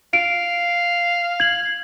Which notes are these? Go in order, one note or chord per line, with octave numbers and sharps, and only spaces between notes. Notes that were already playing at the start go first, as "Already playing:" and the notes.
F5 D7
G#6 F#7